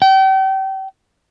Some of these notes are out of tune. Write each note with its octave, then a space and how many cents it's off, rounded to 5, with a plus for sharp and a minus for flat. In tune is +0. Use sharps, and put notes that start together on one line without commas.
G5 -35